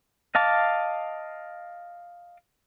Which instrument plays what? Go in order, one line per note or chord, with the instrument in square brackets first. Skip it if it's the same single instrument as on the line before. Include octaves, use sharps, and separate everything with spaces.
[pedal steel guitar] D#5 F5 A5 D6